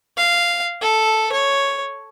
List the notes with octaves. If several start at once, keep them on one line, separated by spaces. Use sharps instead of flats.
F5
A4
C#5